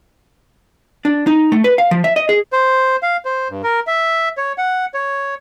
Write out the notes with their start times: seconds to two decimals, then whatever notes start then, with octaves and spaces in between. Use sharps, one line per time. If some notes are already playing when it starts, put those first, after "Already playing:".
1.05 D4
1.27 D#4
1.52 A3
1.64 B4
1.78 F5
1.91 F3
2.04 E5
2.16 D#5
2.29 G#4
2.53 C5
3.03 F5
3.25 C5
3.50 G2
3.64 A#4
3.87 E5
4.37 C#5
4.58 F#5
4.94 C#5